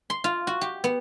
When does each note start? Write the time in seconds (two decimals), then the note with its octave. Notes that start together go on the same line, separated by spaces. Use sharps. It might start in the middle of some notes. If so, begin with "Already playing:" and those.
0.10 C6
0.24 F4
0.47 F#4
0.61 G4
0.84 B3